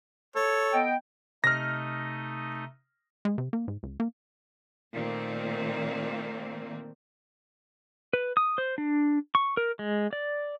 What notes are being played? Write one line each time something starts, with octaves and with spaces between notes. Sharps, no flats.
A4 C#5
B3 D#5 G5
C3 A3 D#4 D#5 F6 A#6
G#3
C3
A#3
G#2
C#2
A#3
A#2 D#3 A3 A#3 C4
B4
D#6
C5
D4
C#6
A#4
G#3
D5